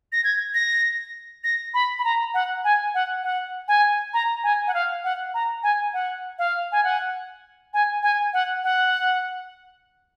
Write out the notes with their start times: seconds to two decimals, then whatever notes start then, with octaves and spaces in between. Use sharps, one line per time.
0.12 A#6
0.24 G#6
0.54 A#6
1.44 A#6
1.74 B5
1.99 B5
2.04 A#5
2.34 F#5
2.64 G#5
2.94 F#5
3.23 F#5
3.68 G#5
4.14 A#5
4.44 G#5
4.67 F#5
4.74 F5
5.04 F#5
5.34 A#5
5.63 G#5
5.94 F#5
6.39 F5
6.72 G#5
6.84 F#5
7.74 G#5
8.03 G#5
8.33 F#5
8.64 F#5